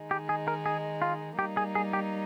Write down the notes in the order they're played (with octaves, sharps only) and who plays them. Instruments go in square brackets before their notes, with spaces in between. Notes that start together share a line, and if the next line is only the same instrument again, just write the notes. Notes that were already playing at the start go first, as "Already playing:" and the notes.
Already playing: [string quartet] D#3 G#3 D#4
[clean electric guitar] G4
G#4
A#4
G#4
F4
[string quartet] G3 A#3 D#4 [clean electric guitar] G4
[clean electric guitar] G#4
G#4
G4